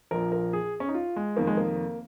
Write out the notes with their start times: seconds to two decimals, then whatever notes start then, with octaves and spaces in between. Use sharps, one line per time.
0.11 A#1 A#2 F3 A#4
0.32 A#4
0.53 G#4
0.80 C#4
0.89 D#4
0.94 F4
1.16 G#3
1.37 F1 F2 D#3 A#3
1.47 G#3
1.57 A#3